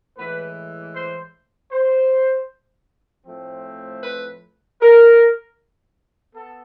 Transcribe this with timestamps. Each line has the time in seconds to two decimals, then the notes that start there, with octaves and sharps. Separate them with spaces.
0.17 A2 E3 G#3 B4
0.94 C5
1.71 C5
3.25 A2 F3 A3 C4
4.02 B4
4.80 A#4
6.34 B3 A4